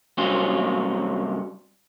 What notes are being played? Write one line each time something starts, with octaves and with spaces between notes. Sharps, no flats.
G2 C3 F#3 C4 C#4 F4